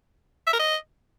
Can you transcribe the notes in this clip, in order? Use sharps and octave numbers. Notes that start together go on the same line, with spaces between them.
E5
A#4
D#5